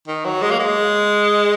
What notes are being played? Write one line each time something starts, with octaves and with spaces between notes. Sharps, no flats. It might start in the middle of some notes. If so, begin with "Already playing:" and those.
D#3
F#3
G#3
A#3
G#3